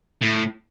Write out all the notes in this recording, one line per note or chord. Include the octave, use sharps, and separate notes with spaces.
A2